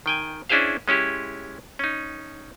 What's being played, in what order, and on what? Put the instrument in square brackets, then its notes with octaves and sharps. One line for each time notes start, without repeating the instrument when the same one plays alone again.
[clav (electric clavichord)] D#3 G5 G#5
C#4 D4 E4 G#4 C5 F5
G#3 C#4 E4 G4
C#4 D#4